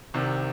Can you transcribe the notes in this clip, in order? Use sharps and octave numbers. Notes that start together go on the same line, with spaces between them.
C2 C3 D#3